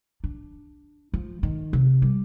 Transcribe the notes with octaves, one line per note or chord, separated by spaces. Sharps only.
D4
F3
D#3
C3
G3